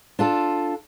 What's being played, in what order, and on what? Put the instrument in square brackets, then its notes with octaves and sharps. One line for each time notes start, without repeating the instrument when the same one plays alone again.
[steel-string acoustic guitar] D4 F4 A4